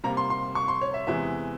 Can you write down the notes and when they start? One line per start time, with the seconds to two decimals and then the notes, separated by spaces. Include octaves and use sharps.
0.04 C3 G3 A#3 A#5
0.17 C6
0.30 C6
0.55 C#6
0.68 C6
0.81 C#5
0.94 E5
1.07 E2 C3 E3 G#3 E5